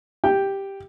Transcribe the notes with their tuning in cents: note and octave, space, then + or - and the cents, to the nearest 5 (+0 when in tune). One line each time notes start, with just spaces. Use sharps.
G4 +0 G5 +0